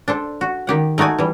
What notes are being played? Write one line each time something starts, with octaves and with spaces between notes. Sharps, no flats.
D4 A4 C5
F#4
D#3 G4 F#5
A3 D#4 F#4 D5 G#5
E3 G3